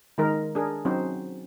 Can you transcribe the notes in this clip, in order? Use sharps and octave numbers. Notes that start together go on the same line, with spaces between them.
D#3 G#3 D#4 A#4
D4 G#4 A#4
F#3 C4 C#4 D#4 F#4 C5